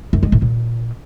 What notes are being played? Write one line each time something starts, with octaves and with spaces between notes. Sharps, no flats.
F#2
G#3
A2
A#2